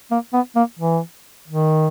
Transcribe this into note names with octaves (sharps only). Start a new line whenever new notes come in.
A#3
B3
A#3
E3
D#3